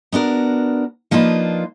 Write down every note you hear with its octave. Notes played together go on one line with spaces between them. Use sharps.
B3 D4 F#4 A#4
F3 A#3 D4 D#4 F4 B4